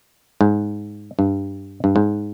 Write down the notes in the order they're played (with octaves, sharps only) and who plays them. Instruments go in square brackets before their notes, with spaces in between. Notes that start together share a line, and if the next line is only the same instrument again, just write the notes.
[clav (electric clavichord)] G#2
G2
G2
G#2